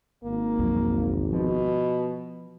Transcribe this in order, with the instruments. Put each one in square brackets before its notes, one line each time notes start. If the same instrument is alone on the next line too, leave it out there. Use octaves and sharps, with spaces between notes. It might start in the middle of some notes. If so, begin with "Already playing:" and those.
[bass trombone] G#1 [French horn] A#3
[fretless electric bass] B1 F2 F#3
[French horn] B2 [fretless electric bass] F3